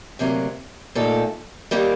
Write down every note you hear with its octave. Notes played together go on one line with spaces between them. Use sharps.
D2 C3 F#3 A#3
A#2 A3 D#4 A4
D#3 G3 A#3